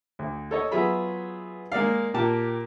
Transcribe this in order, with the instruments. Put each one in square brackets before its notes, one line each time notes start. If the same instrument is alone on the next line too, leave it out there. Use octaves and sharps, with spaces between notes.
[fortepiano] D2
A4 C#5 D#5
F#3 B3 F4 G#4 E5 B5
G#3 A#3 D5 F5
A#2 A#3 G4 A5